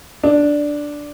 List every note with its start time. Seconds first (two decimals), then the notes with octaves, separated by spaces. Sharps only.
0.23 D4